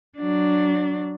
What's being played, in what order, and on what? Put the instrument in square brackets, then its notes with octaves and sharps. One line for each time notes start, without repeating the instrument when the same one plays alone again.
[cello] F#3 D4